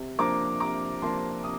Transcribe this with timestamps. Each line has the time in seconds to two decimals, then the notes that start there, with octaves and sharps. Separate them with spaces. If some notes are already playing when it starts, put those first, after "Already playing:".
Already playing: C3
0.18 F3 A#3 D4 A#5 D6
0.60 C3 A#5 D6
1.02 F3 A#3 D4 A5 C6
1.43 C3 D#6